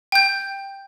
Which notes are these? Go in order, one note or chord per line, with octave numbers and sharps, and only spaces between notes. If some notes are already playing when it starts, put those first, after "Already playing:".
G5 G6